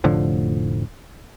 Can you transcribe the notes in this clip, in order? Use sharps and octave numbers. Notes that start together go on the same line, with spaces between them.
F1 A2 D3 F3